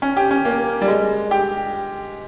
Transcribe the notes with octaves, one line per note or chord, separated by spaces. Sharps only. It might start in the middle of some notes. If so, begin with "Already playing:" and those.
C#4
G4
C#4
A#3
G3
G#3
G4